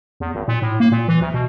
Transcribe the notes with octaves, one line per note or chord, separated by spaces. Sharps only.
E2
G#1
A#2
A2
A#3
A#2
E3
D2
B2